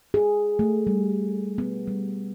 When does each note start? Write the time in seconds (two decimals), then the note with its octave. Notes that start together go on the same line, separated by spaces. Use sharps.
0.14 G#4
0.59 A3
0.87 G3
1.58 B3
1.87 G3